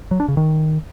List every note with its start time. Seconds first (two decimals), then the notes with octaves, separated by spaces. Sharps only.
0.11 F#3
0.20 D4
0.28 C#3
0.37 D#3